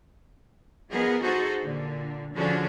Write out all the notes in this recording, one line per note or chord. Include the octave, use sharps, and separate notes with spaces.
F3 B3 G#4 A#4 D#5
D#4 F#4 G#4 A4 C5 D#5
A#2 D3
D3 F3 C#4 D4 F#4 G#4